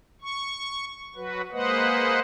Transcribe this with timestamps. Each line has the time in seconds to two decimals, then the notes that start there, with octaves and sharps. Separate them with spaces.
0.21 C#6
1.16 F#3 F#4 B4
1.52 G#3 A#3 B4 C5 D#5 F#5